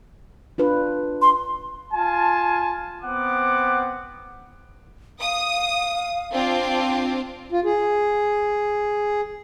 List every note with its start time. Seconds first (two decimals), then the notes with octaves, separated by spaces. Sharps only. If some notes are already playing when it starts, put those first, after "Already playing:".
0.58 D4 F4 B4
1.22 C6
1.93 F4 G#5 A5
3.03 B3 C4 F#5 D6
5.22 F5 D#6
6.33 C4 D4 F4
7.52 F4
7.65 G#4